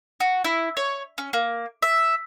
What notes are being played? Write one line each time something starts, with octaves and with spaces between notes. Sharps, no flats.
F#4
E4
C#5
C#4
A#3
E5